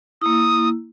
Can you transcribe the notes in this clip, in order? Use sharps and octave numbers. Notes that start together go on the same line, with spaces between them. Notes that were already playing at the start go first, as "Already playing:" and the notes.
A#3 E4 D#6